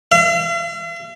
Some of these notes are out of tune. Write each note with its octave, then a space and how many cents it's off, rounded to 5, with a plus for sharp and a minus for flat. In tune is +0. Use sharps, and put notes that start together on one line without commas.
F5 -45